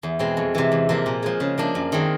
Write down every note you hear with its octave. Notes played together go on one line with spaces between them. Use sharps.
E2
B2 G#3 C4
F2
C3 E3
E2
C3 F3 A#3
A#2
F3 G#3
C#3
F3 A#3 D4
F#2
D#3 G#3 C4